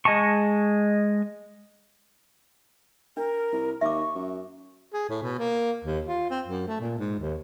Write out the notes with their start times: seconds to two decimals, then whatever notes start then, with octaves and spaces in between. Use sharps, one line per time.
0.05 G#3 D#5 G#5 A5 C#6
3.17 D4 A#4
3.52 C2
3.81 D#2 E5 C#6 D6
4.15 F#2
4.93 G#4
5.09 A2
5.23 B2
5.39 A#3
5.85 D#2
6.08 F4
6.30 C4
6.47 F#2
6.67 A3
6.80 A#2
6.98 G#2
7.19 D#2